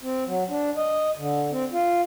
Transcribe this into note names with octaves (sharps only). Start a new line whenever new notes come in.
C4
F#3
D4
D#5
D3
C4
F4